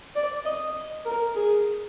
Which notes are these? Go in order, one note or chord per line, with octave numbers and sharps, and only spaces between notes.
D5
D#5
A#4
G#4